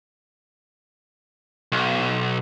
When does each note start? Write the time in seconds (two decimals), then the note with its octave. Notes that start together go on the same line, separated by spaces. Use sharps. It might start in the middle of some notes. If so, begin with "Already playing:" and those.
1.72 B1